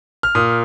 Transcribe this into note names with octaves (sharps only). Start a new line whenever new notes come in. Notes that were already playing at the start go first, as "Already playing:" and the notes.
F6
A#2 D#6